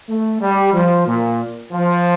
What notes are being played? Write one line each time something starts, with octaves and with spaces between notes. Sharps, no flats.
A3
G3
F3
A#2
F3